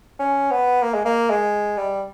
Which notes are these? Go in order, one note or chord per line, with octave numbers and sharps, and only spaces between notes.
C#4
B3
A#3
G#3
A#3
G#3
G3